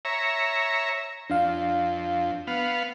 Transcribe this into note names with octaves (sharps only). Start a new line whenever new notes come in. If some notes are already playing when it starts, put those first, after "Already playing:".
C#5 E5 A#5
F2 D4 F5
B3 F5